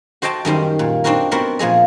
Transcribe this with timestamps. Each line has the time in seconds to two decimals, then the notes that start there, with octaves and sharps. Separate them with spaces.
0.22 F#4 C5 D#5 G5 A5
0.45 F#2 D#3 G3 C5
0.79 A#2
1.04 C4 D4 D#4 F#4 A#4
1.31 B3 C4 F#4 A#4 F#5 G5
1.59 A#2 F3 G#4 D#5